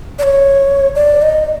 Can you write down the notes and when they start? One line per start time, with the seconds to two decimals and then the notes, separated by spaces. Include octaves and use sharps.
0.19 D5
0.23 C#5
0.96 D5
1.22 D#5